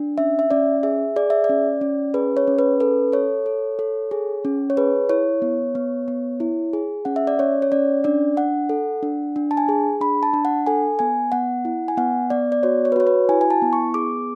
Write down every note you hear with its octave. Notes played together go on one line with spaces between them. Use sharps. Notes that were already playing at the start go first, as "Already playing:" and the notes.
Already playing: D4
C#4 E5
E5
C#4 D5
G#4 E5
G#4 D5
E5
D5
C#4
C#4
G#4 B4
C#5
C#4
B4
A4 B4
A4 C#5
A4
A4
G#4
C#4
C#5
G#4 B4
E4 C#5
B3
B3
B3
E4
G#4
C#4 F#5
E5
D5
C#4 C#5
C#5
C#4 D5
D4 D5
D4 F#5
A4
D4
D4
A5
G#5
G#4
D4 B5
A5
D4
F#5
A4 G#5
B3 G#5
B3 F#5
E4
G#5
B3 F#5
B3 D5
D5
F#4 C#5
C#5
B4
F#4 C#5
B4
E4 G#5
G#5
A5
B3
C#6
G#4 D6